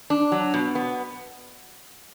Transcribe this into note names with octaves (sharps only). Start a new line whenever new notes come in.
D4
F#3
B2
B3